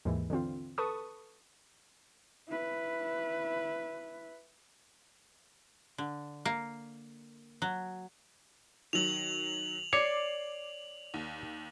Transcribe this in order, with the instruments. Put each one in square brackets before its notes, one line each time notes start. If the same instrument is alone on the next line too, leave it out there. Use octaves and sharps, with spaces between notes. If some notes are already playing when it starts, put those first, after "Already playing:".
[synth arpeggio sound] D#2 G#2 E3
D3 E3 C4 F4
A4 B4 A5 C#6 D#6
[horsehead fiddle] E4 B4
[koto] D3
A#3
F#3
[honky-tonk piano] D#3 F#3 [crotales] F7 F#7
[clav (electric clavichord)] C#5 [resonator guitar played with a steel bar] D5 [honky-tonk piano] D6 C7
[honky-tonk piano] D#2